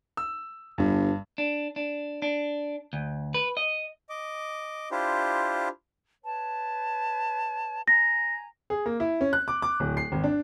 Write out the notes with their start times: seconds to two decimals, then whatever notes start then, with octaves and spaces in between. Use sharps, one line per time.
0.17 E6
0.78 G1 G2
1.38 D4
1.76 D4
2.22 D4
2.93 D2
3.34 B4
3.57 D#5
4.09 D#5 D6
4.91 D4 E4 F4 G4 C5
6.24 B4 C#5 A5
7.88 G#5 A#5 A#6
8.70 G#4
8.86 A#3
9.00 E4
9.21 C#4
9.33 F#6
9.48 D6
9.62 D6
9.80 D1
9.97 C7
10.12 G#1
10.24 D4